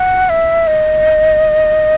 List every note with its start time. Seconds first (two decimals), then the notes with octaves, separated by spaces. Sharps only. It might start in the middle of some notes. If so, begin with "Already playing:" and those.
Already playing: F#5
0.30 E5
0.67 D#5